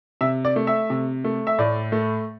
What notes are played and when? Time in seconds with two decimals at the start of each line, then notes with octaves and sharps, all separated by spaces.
0.21 C3 E5
0.45 D5
0.56 A3
0.67 E5
0.90 C3
1.24 A3
1.47 E5
1.59 A2 D5
1.92 A3